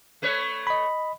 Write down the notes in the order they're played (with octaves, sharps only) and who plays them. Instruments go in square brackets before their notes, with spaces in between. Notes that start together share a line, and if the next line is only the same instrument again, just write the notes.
[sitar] A3 B4 C#5
[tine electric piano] D#5 B5